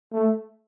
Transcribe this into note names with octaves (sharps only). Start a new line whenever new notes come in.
A3